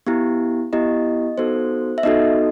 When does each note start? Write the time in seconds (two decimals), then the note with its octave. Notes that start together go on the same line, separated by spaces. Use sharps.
0.07 B3 E4 G4
0.73 B3 E4 G4 D#5
1.38 B3 D#4 F#4 A4 C5
1.98 E5
2.03 B3 D#4 F#4 A4 D#5